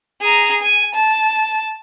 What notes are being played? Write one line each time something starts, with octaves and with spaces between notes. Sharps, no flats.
G#4 A#5
G#5
A5